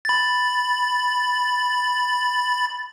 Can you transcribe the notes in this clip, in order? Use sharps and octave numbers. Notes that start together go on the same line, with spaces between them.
B5 A6